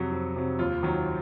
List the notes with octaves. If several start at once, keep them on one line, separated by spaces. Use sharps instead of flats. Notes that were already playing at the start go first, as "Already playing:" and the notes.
Already playing: F2 C3 F#3
F2
C3 F#3
D#2 F4
D#3 F#3